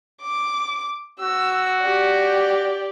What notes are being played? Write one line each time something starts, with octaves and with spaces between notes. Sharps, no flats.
D6
F#4 E6
G4 D5